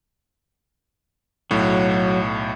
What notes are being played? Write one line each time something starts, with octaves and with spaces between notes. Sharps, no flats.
B1 A2 F#3